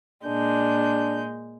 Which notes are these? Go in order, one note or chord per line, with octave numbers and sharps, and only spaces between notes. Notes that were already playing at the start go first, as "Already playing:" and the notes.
A#2 G#3 D4 G6